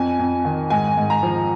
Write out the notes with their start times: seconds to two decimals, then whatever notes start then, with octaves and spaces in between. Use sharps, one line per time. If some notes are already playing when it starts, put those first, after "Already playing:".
Already playing: F2 G#5
0.19 F2
0.45 D#3
0.70 G#2 G#5
0.97 G#2
1.10 A#5
1.23 F3